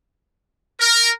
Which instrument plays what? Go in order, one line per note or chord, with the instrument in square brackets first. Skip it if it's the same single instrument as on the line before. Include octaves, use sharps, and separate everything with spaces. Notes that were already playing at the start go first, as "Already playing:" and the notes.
[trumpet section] A#4